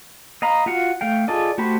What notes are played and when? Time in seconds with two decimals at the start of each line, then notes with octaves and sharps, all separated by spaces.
0.42 D#5 F5 A#5 B5
0.66 F4 F#4 F5 F#5
1.01 A3 F5 G5
1.28 F4 G#4 A4 D5 D#5
1.58 A3 F#4 G4 C5 B5